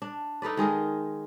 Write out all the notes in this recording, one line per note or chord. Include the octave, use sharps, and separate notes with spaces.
D4
D#4 A4 B4 D5
D#3 G#3 G#4 A#4